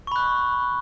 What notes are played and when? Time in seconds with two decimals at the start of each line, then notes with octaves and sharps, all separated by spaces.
0.07 C#6
0.12 B5
0.16 F#6